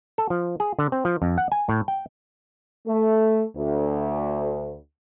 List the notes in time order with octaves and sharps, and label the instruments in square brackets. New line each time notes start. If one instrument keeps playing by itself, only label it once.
[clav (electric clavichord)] A4
F3
G#4
D3
C4
F3
F2
F#5
G#5
A2
G5
[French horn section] A3
D2